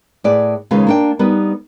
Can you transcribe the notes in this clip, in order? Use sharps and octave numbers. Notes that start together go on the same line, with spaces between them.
A2 G#4 B4 D5
D#2 C#3 G#3 F4 B4 F5
A#3 D4 G5
G3 B3 D#4 B4